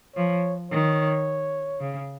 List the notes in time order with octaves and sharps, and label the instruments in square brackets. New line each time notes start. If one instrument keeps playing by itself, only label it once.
[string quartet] F3 [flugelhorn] C#5
[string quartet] D#3 [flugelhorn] C#5
[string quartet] C#3